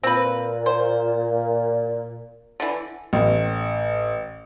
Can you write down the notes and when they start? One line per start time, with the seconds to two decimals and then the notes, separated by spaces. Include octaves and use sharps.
0.03 A#2 C4 B4
0.66 C5
2.60 D3 E3
3.13 A1